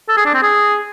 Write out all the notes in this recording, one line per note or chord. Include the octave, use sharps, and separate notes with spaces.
A4
G#4
D4
C4
G#4